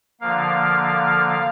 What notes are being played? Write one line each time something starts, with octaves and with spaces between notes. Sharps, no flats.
D3 F3 A#3 F5